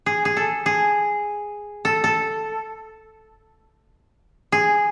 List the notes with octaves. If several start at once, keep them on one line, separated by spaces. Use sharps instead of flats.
G#4
G#4
A4
G#4
A4
A4
G#4